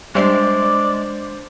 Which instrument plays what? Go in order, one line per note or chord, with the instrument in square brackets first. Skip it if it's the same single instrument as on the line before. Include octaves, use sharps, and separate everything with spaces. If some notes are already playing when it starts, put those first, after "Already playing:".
[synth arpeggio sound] G3 E5 C7 [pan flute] G#3 [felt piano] D4 C5 [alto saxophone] D5